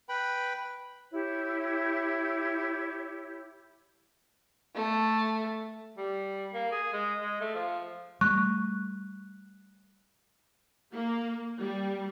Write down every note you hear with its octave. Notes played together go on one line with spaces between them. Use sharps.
B4 G5 B5
E4 G4 C#5
A3
G3
A#3
G#4
G#3
G#3
A3
F3
G3 A3 C#6 F#6
A#3
G3